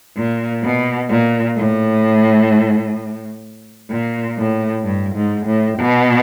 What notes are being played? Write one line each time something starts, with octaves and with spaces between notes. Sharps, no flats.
A#2
B2
A#2
A2
A#2
A2
G2
G#2
A2
B2